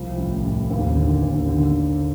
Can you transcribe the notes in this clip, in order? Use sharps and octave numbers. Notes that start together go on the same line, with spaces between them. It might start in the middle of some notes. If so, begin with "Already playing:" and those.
Already playing: C2 F3
A1
A1
D#2
D3
D#2
D3